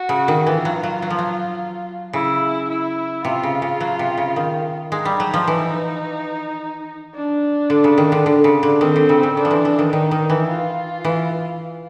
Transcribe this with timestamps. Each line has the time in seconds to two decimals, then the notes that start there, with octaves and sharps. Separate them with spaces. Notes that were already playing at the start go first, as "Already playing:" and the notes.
Already playing: F#4
0.09 C#3
0.28 D#3
0.47 E3 F4
0.65 F#3
0.83 F#3
1.02 F#3
1.10 F3
1.19 F#3
2.13 C#3 E4
2.70 E4
3.25 C3 F4
3.43 C#3
3.62 C#3
3.80 F#3
3.99 C3
4.18 C#3
4.36 D#3
4.91 G#3 D#4
5.05 G3
5.20 F#3
5.34 F3
5.47 E3 D#4
7.15 D4
7.70 D3
7.84 C#3
7.98 D#3
8.12 D3
8.26 D3
8.44 C#3
8.63 D3
8.81 D#3 C4
8.96 D3
9.09 C#3
9.23 C#3
9.37 D3 D4
9.45 F3
9.51 E3
9.65 E3
9.79 D#3
9.93 D#3 D#4
10.11 D#3
10.30 E3
10.49 F4
11.04 E3